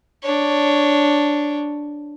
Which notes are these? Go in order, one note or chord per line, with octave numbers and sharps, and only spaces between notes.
D4 C#5